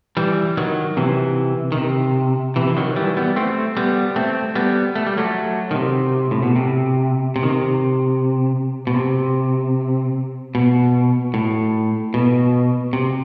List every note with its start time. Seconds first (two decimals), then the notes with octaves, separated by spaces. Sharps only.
0.17 E3 G3
0.57 D#3 F#3
0.97 C3 E3
1.72 D#3
1.77 C3
2.56 C3 E3
2.67 E3
2.77 D#3 F#3
2.96 E3 G3
3.17 G3 B3
3.36 A3 C4
3.77 G3 B3
4.16 A3 C4
4.55 G3 B3
4.95 A3
5.07 G3
5.17 F#3 A3
5.71 D#3
5.75 C3
6.31 A2
6.43 B2
6.56 C3
7.36 C3
7.43 D#3
7.50 C3
8.87 B2
8.94 C3
10.55 B2
11.34 A2
12.14 B2
12.93 C3